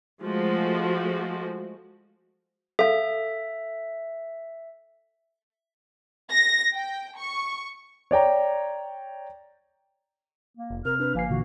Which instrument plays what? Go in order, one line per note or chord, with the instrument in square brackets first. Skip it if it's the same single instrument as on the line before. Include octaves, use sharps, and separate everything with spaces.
[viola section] F3 G#3 A3 F#4
[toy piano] A4 F5 [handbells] E5
[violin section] A#6
G5
C#6
[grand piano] C#5 D5 G5 A#5
[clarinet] A#3
[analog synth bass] F1
[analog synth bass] C3 [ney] A#4 [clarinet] F6
[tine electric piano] D4 [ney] B4
[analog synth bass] G1 [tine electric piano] F3 G#5 C7 [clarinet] A#3
[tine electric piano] A#2 D3 E3 [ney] F#4